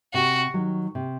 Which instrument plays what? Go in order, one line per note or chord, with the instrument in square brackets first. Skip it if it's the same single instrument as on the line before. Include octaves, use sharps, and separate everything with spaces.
[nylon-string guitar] C3 [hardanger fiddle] F#4
[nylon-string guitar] D#3 F#3
C3